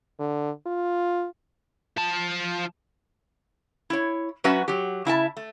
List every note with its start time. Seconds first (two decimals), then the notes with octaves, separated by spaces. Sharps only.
0.19 D3
0.66 F4
1.97 F3 A5
3.90 E4 C#5
4.44 F#3 C#4 F#4 B4 E5 F#5
4.68 F#3 G4
5.05 C#3 E4 E5 A5
5.37 A3